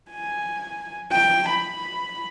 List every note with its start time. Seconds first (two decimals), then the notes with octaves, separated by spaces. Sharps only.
0.10 G#5
1.12 G5
1.48 B5